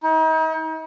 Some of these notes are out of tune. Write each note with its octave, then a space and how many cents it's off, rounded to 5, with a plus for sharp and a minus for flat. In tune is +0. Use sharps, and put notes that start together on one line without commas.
D#4 +40